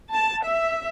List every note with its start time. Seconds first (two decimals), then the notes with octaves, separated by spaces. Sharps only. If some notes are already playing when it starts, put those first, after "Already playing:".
0.12 A5
0.44 E5